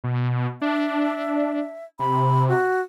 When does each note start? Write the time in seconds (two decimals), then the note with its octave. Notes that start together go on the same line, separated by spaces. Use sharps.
0.04 B2
0.62 D4 E5
1.99 C3 B5
2.49 F#4